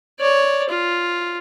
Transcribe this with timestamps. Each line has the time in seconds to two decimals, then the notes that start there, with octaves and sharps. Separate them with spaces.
0.20 C#5 D5
0.69 F4